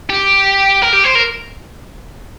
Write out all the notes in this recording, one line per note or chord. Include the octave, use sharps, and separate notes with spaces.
G4
A#4
G4
C5
A#4